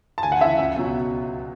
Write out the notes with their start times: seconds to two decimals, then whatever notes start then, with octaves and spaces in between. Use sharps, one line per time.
0.18 A5
0.23 D2 G#5
0.32 F#5
0.41 C#3 E3 E5
0.59 C#2
0.76 B2 F#3